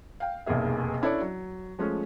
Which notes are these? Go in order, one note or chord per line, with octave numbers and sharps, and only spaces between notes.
F5 G5
F1 B1 E2 A#3 G#4 E5
C#4 D4 E4 A4 C#5 D5
F#3
F3 G#3 A3 C#4